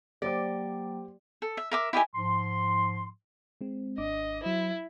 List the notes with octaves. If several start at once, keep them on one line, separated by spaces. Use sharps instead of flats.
F#3 A#3 G4 C5 D5 G5 D6
A4
E5
A#4 E5 D6
E4 G4 D#5 G#5
G#2 F3 C6
G#3 C4
G#1 D4 D#5 D6
F#3 E4 C5